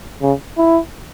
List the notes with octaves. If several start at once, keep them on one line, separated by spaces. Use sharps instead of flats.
C#3
E4